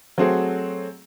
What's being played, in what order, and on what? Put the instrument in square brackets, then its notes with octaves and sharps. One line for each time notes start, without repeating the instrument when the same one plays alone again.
[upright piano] F#3 A3 C4 F#4 G#4